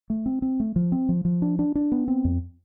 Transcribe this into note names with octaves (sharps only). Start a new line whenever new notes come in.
A3
C4
C4
A3
F3
C4
F3
F3
D4
D4
D4
B3
C4
F2